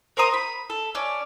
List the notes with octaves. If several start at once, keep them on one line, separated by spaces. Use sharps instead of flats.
A#4 C5 A#5 D#6
B5
A4
C#4 D5